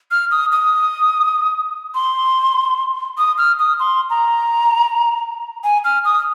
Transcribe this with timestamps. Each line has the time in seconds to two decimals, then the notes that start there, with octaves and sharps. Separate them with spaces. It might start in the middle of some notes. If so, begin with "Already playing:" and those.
0.11 F6
0.31 D#6
0.52 D#6
1.94 C6
3.18 D#6
3.38 F6
3.59 D#6
3.79 C6
4.10 A#5
5.64 G#5
5.84 F6
6.05 D#6